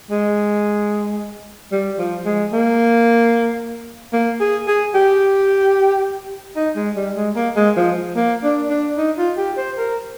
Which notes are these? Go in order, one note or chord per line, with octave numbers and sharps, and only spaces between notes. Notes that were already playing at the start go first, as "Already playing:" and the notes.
G#3
G3
F3
G#3
A#3
A#3
G#4
G#4
G4
D#4
G#3
G3
G#3
A#3
G#3
F3
A#3
D4
D4
D#4
F4
G4
C5
A#4